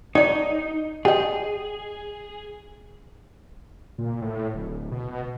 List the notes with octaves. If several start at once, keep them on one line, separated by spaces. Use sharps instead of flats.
D#4 C#5 D5
G4 G#4 D#5
A#2
A2
D1
B2